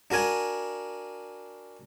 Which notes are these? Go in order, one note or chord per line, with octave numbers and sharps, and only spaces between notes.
D4 F#4 A#4 G#5